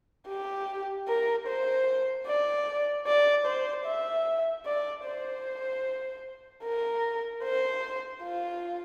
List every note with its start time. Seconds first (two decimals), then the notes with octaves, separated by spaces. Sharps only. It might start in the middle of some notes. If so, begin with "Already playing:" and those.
0.28 G4
1.08 A#4
1.48 C5
2.27 D5
3.07 D5
3.46 C5
3.86 E5
4.66 D5
5.05 C5
6.64 A#4
7.44 C5
8.23 F4